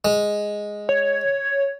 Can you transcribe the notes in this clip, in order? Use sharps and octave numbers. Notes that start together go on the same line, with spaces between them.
G#3
C#5